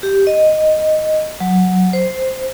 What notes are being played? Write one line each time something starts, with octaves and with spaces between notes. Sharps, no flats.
G4
D#5
F#3
C5